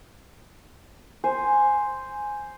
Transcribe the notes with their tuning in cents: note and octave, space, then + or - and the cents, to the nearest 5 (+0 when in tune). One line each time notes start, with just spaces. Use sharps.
C5 +0 G#5 +0